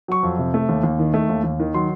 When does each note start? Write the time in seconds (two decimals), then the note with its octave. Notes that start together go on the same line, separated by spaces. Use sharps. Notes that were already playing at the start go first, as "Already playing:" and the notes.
0.08 F#3 C#6
0.23 F2
0.38 C3
0.54 A3
0.69 D#2
0.83 D#2
0.99 D#3
1.14 A3
1.29 D#2
1.44 D#2
1.60 D#3
1.74 F#3 C6